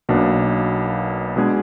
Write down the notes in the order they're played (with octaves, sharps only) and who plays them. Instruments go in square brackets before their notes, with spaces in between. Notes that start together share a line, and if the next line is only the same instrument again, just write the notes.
[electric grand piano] B1 B2 A#3 D4
B2 G#3 D4 G#4